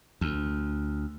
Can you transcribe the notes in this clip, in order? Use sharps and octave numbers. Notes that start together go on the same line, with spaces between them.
D2